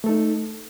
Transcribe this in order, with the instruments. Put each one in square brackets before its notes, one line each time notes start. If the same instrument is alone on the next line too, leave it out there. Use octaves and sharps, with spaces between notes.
[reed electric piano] A3
A4
D#4